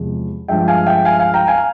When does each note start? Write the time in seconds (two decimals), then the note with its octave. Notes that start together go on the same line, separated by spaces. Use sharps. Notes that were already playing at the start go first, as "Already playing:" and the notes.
Already playing: E2 C3 F3 G#3
0.48 G2 F3 G#3 E5 G5
0.68 F5 G#5
0.86 E5 G5
1.05 F5 G#5
1.19 F5 G#5
1.34 G5 A#5
1.48 F5 G#5
1.58 G#5